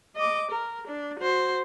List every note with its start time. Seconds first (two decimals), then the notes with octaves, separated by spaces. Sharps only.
0.16 D#5 D6
0.51 A#4
0.87 D4
1.19 F#4 C5